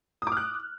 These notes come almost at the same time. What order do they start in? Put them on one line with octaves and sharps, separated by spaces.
D#6 D6 F6 F#6